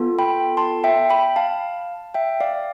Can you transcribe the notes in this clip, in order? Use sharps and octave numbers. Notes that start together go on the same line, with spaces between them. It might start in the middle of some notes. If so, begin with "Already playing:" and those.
Already playing: B3 F4 A4
G5 B5
A5 C6
E5 G5
G5 B5
F5 A5
E5 G5
D5 F5